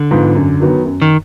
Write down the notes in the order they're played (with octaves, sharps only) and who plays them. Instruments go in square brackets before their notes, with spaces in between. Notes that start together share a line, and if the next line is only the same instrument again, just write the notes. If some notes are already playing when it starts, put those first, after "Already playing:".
Already playing: [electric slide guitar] D3
[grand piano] G#2 F3 B3 F4
F#2
D#3 F#3 B3
F#2
[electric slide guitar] D#3